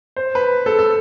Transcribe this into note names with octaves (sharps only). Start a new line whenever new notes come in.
C5
B4
A4
A4